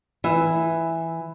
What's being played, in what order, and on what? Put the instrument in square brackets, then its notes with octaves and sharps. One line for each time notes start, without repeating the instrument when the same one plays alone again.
[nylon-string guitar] E3 E5